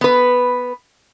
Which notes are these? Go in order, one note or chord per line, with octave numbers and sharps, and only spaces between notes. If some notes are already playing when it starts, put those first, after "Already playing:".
B3 B4